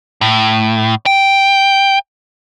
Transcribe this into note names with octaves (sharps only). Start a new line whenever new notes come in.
A2
G5